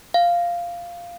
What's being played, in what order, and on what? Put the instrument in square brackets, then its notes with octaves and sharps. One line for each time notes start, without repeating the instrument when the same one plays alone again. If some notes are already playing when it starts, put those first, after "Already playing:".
[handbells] F5